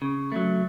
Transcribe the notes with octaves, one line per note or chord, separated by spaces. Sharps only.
C#3
F#3 A3